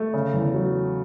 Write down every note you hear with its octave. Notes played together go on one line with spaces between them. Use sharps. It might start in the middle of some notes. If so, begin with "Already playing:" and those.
Already playing: A3
C#3
E2
F#3